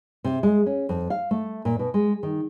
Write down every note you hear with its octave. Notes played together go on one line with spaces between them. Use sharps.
C3
G#3
C#4
F2
F5
A3
A#2
B2
G#3
D#3